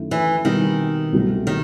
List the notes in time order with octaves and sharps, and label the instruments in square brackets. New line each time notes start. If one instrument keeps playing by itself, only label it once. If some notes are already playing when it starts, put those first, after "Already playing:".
Already playing: [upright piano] F#2 D#3 A3 E4
[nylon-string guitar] E3
[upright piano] B2 G3 C4 E4 [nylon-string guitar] D#3
[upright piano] C2 B2 F#3 A3
[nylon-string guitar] D#3